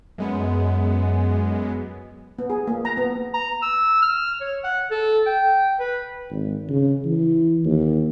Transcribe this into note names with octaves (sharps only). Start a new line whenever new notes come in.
F#2 G#3 B3
B3
G#4
A#3
A#5
B3
A#5
E6
F6
C#5
F#5
A4
G5
B4
G#1
C#3
E3
D#2